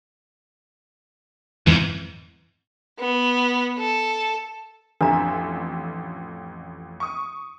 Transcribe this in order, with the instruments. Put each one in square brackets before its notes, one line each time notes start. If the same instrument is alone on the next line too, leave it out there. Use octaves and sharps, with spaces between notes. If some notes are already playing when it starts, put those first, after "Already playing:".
[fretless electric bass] F2 E3 [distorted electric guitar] G#2
[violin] B3
A4
[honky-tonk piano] A1 F2 E5 [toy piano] D4 A#5
[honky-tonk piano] C#6 D#6